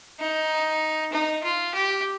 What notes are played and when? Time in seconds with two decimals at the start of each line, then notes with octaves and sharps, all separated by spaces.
0.20 D#4
1.12 D#4
1.43 F4
1.74 G4